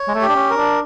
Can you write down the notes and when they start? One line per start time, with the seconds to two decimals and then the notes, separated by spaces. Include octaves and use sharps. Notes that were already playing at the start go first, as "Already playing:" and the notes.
Already playing: C#5
0.08 G#3
0.15 A3
0.22 G4
0.28 D4
0.36 C#4
0.50 A#4
0.57 D4